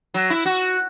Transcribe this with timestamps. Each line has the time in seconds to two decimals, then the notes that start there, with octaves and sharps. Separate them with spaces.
0.14 F#3
0.30 E4
0.46 F#4